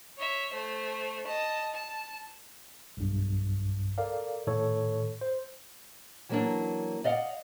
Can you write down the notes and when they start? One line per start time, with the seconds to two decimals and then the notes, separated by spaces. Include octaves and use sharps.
0.18 C#5 E5
0.52 A3 C5
1.26 D#5 A5
1.74 A5
2.97 B1 G2
3.98 A4 A#4 D5 F5
4.47 A2 D#3 A4 C#5
5.21 C5
6.29 E3 F#3 G3 A#3 C#4 D4
7.04 D5 D#5 F5 F#5